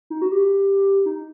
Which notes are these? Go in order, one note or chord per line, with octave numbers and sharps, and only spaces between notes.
D#4
F#4
G4
D#4